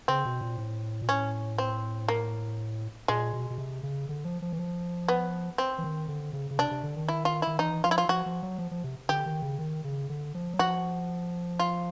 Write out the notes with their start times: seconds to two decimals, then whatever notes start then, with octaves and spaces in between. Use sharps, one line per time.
0.08 C#3 C4
0.25 B2
0.41 A#2
0.58 A2
1.02 A#2
1.08 A2 C#4
1.58 C4
2.08 A#3
3.08 A#2 G#3
3.33 B2
3.50 B2
3.58 C3
3.83 C#3
4.09 D3
4.25 F3
4.42 F3
4.53 E3
4.59 F3
5.08 B3
5.58 C4
5.78 E3
5.84 D#3
6.08 D3
6.33 C#3
6.51 C#3
6.59 C3 D4
6.71 C3
6.83 D3
6.96 D#3
7.08 E4
7.25 F4
7.42 D#3 E4
7.59 E3 D#4
7.84 F3 F4
7.91 E4
7.98 F4
8.09 F3 F#4
8.26 F3
8.43 F#3
8.58 F3
8.71 F3
8.84 C3
9.09 D3 G4
9.26 D#3
9.42 C#3
9.59 D#3
9.84 C#3
10.10 D3
10.35 F3
10.54 F#3
10.59 F3 F#4
11.59 F4